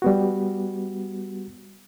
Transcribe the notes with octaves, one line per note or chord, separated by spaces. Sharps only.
G3 B3 F#4